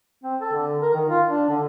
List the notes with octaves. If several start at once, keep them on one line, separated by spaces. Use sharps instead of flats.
C4
A4
D3
A#4
D#3
F4
D4
D3